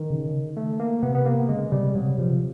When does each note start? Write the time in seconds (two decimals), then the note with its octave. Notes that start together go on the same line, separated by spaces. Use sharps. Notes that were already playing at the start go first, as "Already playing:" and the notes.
Already playing: D#3
0.10 C#3
0.57 A3
0.80 A#3
1.02 C3 B3
1.15 B3
1.25 A#3
1.48 C#3 G#3
1.72 C3 G3
1.95 C3 F#3
2.18 C3 F3